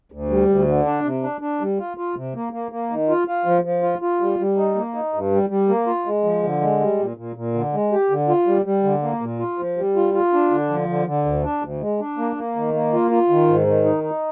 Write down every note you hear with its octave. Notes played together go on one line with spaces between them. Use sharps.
D2
G3
D2
D3
D4
C3
D4
D4
G3
F4
F4
C3
A#3
A#3
A#3
D#3
F4
F4
F3
F3
F4
F4
G3
G3
D#4
A#3
D#4
G2
G3
G3
A#3
F4
G#3
F3
D3
G#3
G3
A#2
A#2
A#2
D3
G#3
G4
D3
F4
G3
G3
D3
A#3
A#2
F4
F3
G3
F4
F4
D4
D3
F3
D3
D3
D2
D4
D2
G#3
D4
A#3
A#3
D#3
A#3
F4
F4
D#3
G#2
D#3
D#4
D#4